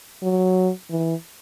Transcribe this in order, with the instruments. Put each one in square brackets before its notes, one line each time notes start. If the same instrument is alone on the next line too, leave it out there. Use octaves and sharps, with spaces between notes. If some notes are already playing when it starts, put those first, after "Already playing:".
[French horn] F#3
E3